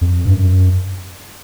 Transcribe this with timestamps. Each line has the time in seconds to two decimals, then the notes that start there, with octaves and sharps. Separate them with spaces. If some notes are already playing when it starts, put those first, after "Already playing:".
0.01 F2
0.25 G2
0.34 F#2